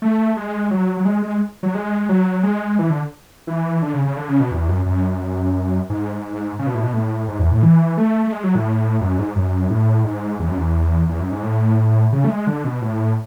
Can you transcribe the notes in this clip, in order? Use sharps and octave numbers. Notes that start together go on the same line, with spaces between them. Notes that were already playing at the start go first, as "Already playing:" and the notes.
A3
G#3
F#3
F#3
G#3
G#3
F#3
G#3
F#3
G#3
E3
D3
E3
D3
C#3
C#3
D3
C#3
B2
E2
F#2
F#2
G#2
C#3
B2
A2
B2
A2
G#2
E2
A2
E3
A3
A3
G#3
F#3
A2
F#2
G#2
F#2
A2
G#2
E2
F#2
E2
E2
F#2
G#2
A2
C#3
A3
G#3
D3
B2
A2